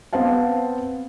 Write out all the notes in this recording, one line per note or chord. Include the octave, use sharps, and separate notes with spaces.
B3 C4 B4 C5 F5 A5